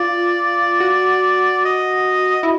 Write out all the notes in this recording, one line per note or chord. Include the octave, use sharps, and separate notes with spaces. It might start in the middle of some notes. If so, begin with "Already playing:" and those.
Already playing: F4 D5
F#4
D#5
E4